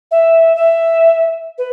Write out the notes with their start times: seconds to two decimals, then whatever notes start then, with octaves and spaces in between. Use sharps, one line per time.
0.11 E5
0.55 E5
1.58 B4